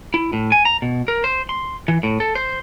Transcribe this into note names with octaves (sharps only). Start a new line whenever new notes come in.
E4
A2
G#5
A#5
B2
A#4
C5
C6
E3
A2
A4
C5